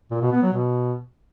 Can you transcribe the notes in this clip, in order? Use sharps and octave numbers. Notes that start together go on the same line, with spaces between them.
A#2
B2
B3
F#3
B2